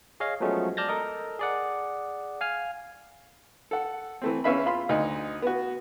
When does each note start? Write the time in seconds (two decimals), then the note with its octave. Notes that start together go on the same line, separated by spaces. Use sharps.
0.20 G#4 C#5 D#5 F5
0.40 F3 F#3 G#3 A3 B3 C#4
0.77 D5 A5 F6 G6 A6 A#6
0.88 A4 A#4 D#5
1.39 G#4 D5 F#5
2.41 F5 G#5 F6
3.71 A4 F#5
4.22 E3 A3 C4
4.44 E2 C#4 B4 E5 F5 B5
4.66 F4 F5 B5 C6
4.89 D2 D#4 D#5
5.42 B3 F#4